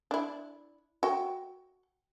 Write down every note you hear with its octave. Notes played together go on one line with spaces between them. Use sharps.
D4 E4
F#4 G5